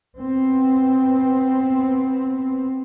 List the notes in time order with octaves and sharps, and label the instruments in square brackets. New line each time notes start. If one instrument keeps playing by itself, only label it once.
[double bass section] B3 C4